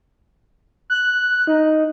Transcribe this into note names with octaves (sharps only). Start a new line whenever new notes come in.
F#6
D#4